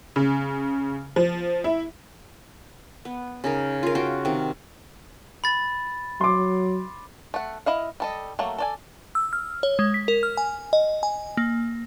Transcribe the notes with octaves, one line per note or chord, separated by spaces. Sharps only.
C#3
F3
E4
B3
C#3 D#4 A#4
F4 A#4
F4 F#4 A#4 G5
C3 D#3
B5 A6
F#3 C6 D6
A3 F#5
E4 D#5 F5
G3 A4 D#5
F#3 A3 A#3
A4 D5 G#5
E6
F6
C#5
G#3
B6
A#4
F6
G#5
D#5
G#5
A#3